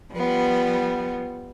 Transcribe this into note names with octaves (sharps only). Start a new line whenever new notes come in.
F3 G3 B3